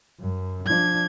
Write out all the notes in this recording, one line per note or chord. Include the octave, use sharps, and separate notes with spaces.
F#2
F3 D4 G#6